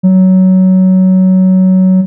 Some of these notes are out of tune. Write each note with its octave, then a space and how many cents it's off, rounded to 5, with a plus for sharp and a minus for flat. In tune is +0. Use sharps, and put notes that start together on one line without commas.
F#3 +15